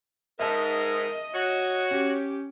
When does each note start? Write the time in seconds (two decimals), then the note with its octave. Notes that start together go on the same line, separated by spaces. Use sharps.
0.39 G#2 A#4 D#5 E5 A5
1.34 F#4 C#5
1.91 C#4 G4